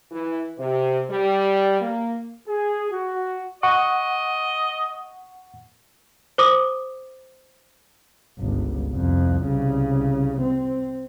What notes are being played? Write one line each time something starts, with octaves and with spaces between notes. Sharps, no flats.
E3
C3
G3
A#3
G#4
F#4
D#5 F#5 C#6
C5 D6 D#6
G1 C#2
C2 F2
C2 C#3
C4